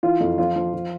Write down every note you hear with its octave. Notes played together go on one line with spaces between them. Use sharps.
E3 F4
F2
F3 F4
F3
F3